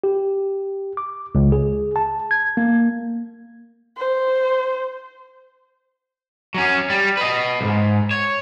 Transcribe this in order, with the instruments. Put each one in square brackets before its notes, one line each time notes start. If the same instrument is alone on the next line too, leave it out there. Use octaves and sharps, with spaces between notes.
[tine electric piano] G4
D6
C#2
G#4
A5
G#6
A#3
[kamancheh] C5
[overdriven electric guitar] F#3 C#4
G3
B4 D#5
B1 G#2
C#5